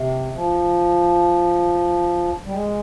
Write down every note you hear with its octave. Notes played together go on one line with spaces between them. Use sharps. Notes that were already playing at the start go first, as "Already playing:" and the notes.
Already playing: C3
F3
G3
G#3